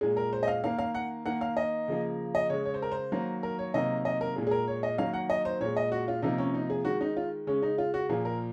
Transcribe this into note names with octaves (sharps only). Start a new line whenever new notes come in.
A#2 G#3 G#4
A#4
C5
D#5
F5
D#3 A#3 F5
F5
F#5
D#3 A#3 F#5
F5
D#5
C#3 F3 A#3
D#5
C#3 G#3 C#5
C#5
C5
A#4
C5
D#3 F#3 A#3
A#4
C#5
C3 D#3 F#3 A#3 D#5
D#5
A#4
A#2 G#3 G#4
G#4
A#4
C#5
D#5
D#3 F#3 A#3 F5
F#5
D#5
C5
A#2 G#3 C#5
D#5
F#4
F4
C3 F3 A#3 D#4
C#4
D#4
G#4
D#3 G#3 F#4
D#4
F4
C#3 G#3 C#4
D#4
F4
F#4
A#2 F3 A#3 G#4
A#4